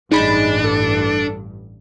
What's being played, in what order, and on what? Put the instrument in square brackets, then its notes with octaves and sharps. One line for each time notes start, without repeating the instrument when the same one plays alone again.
[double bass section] A1 G2 [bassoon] G#3 [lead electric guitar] D4 [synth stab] D#4 B5
[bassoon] A4